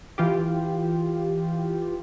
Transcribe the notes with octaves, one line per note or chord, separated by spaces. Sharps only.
E3 F4 G4